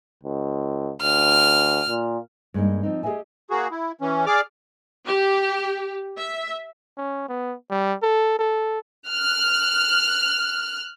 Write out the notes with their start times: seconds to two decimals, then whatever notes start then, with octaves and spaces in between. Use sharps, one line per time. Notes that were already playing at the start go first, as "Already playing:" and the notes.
0.23 C#2
1.02 D2 F6
1.88 A#2
2.54 G2 G#3 A#3 D#4
2.83 F3 C4 D#4
3.03 G4 G#4 B4 D#5 E5 G#5
3.50 A#3 F#4 G#4
3.71 E4
4.01 E3 C#4
4.26 G#4 D5 D6 F6
5.05 G4
6.19 E5
6.97 C#4
7.29 B3
7.70 G3
8.03 A4
8.39 A4
9.08 F6 F#6